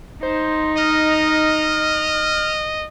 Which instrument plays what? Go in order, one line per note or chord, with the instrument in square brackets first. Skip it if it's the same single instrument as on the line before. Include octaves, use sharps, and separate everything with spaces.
[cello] D#4 [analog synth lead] C5
[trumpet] D#5 [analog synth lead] F6